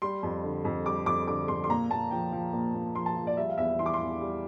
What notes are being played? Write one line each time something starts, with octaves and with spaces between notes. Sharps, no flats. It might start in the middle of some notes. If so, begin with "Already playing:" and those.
G3 C6
F2
D3
F2
G3 D6
F2 D6
D3 D6
F2 C6
C6
A#2 A#5
A#2 A5
F3 G5
F3
A#2
A#2
F3 C6
A5
F3
D5
G3 E5
F5
E2 E5
E3 C6
D6
C6
E2
G3